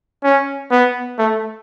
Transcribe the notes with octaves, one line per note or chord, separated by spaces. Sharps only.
C#4
B3
A3